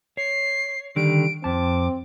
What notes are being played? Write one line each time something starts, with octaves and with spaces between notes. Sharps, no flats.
C#5 C7
D3 D#3 G3 D7
F2 C4 A5 D6